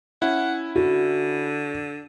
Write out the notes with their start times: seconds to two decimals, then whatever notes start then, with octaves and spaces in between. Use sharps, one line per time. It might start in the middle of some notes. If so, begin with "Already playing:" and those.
0.22 C#4 E4 F#5
0.76 D3 F#4